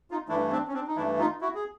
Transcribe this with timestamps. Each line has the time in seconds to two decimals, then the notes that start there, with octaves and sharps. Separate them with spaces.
0.11 D#4 F4
0.28 G2 E3 A3 D4 E4
0.51 C4 D4
0.68 C#4
0.73 C4 D4
0.87 D#4
0.96 G2 E3 A3 D4 E4
1.19 D#4 F4
1.41 E4 F#4
1.55 G#4